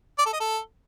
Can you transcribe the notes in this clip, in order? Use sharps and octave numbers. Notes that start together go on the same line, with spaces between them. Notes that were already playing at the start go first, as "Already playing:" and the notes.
D5
A4
D#5
A4